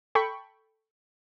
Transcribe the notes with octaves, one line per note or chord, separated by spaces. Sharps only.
A4 G5 B5 C#6